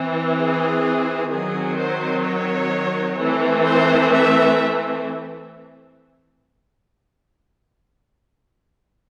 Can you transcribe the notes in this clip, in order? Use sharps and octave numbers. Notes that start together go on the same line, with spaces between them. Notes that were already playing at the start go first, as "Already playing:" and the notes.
Already playing: E3 C4
G#4
D#3 F#3 C4 G#4
C5
C#5
E3 A3 C4
C5
E5